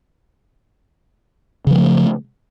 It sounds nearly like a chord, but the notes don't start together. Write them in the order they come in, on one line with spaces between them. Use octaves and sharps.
C#3 F3 G3 A3